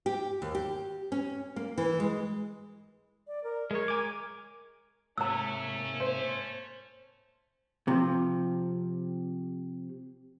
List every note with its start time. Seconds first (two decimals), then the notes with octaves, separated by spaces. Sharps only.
0.06 G4
0.42 D#2
0.55 G4
1.12 C#4
1.56 A#3
1.78 E3
2.00 G#3
3.27 D5
3.44 A#4
3.71 G#3 A#4 C#5
3.88 G#5 D6
5.18 G#2 C3 A3 A#3 C#4 A#5 E6
6.00 C5
7.88 C3 F3